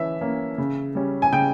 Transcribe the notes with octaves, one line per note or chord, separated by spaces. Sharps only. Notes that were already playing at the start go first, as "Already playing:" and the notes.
Already playing: E3 C#4 E5
A#3 C#4
C#3
G3 C#4
G#5
C#3 G5